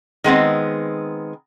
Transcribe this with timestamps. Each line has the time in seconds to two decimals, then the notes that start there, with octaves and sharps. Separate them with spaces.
0.24 D#3 G#3 B3 C4